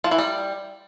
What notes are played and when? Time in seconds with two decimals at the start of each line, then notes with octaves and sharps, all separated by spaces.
0.04 F3
0.11 E3
0.18 G3